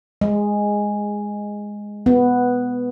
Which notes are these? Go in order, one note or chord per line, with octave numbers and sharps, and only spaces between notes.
G#3
B3